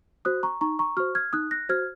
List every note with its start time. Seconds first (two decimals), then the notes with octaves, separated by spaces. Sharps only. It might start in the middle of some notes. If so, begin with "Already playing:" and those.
0.25 F#4 C5 D#6 F#6
0.43 A#5 C#6
0.61 D#4 A#5 C#6
0.79 A#5 C#6
0.97 F#4 C5 C#6 F6
1.15 F6 G#6
1.33 D#4 D#6 F#6
1.51 F#6 A#6
1.69 F#4 C5 F6 G#6